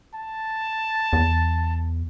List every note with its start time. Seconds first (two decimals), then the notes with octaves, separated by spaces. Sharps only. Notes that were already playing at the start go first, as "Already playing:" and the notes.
0.15 A5
1.13 E2